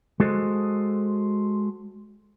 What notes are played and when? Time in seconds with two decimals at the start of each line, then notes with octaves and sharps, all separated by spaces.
0.20 G#3 F#4 A4 C5 D#5